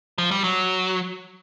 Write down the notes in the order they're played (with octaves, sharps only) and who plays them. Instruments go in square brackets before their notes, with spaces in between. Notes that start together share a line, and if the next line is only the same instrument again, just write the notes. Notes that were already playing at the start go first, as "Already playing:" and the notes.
[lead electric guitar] F3
G3
F#3